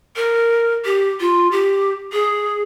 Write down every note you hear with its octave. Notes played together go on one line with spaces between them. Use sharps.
A#4
G4
F4
G4
G#4